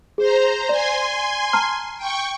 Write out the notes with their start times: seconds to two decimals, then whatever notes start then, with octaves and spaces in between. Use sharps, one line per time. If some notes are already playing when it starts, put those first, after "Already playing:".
0.18 G#4 C5 A#5
0.69 D5 G#5 C6
1.53 A5 A#5 F6
1.97 G5 C#6